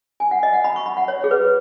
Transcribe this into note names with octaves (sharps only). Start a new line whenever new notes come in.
G#5
F#5
D#5
F#5
B5
C#6
B5
F#5
C#5
G#4
B4